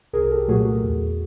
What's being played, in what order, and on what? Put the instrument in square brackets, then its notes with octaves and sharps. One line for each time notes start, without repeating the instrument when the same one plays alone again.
[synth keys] C2 G#4 A#4
G4 A4
A#2 F#3 A3 F#4 G#4
F#4 G#4
E2